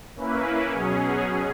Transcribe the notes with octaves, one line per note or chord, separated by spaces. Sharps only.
A#3 C#4 E4 B4
B2 F#3 C#4 G#4